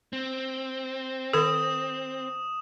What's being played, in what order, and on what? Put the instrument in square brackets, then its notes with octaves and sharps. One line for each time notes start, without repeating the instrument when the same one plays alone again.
[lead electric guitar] C4
[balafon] D#3 A4 [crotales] D#6 E7